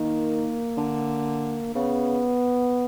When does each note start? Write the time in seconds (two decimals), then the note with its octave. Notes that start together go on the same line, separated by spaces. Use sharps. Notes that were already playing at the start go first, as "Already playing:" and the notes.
Already playing: D#3 A#3
0.77 D3
1.75 C#3 B3